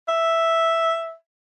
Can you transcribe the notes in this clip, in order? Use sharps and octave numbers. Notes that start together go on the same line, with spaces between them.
E5